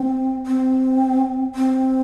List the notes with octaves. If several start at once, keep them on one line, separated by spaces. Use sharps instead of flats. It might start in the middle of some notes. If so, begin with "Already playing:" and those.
Already playing: C4
C4
C4